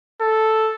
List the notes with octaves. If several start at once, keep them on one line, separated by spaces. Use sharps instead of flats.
A4